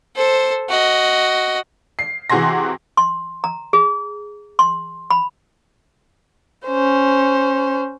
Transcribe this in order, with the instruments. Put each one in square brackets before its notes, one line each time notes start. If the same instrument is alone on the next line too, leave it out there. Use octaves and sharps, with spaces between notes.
[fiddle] A4 C5
F#4 D#5
[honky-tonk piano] C7
C3 E3 F#4 G#4 C6 A#6
[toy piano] C6
A#5
G#4
C6
B5
[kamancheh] C#4 C5